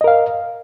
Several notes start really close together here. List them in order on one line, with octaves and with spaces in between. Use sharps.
D#5 A#4 F5